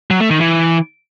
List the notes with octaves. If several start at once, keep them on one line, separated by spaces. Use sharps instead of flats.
F#3
A3
D#3
E3